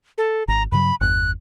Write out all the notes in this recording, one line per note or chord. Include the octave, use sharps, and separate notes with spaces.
A4
G#1 A#5
G2 C#3 F#3 B5
G1 E2 F#6